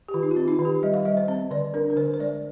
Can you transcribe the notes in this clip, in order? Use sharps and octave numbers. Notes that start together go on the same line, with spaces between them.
G4
D#3 F4
D#4
F4
C4
D#4
D#3
G4
G3 D#5
F5
G3 D#5
C5
C4
D3 D5
D4 A#4
A#4
D3 C5
C5
G#3 D5